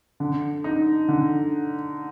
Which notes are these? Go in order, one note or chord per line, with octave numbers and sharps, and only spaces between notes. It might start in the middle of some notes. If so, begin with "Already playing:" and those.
D3
D#4
D3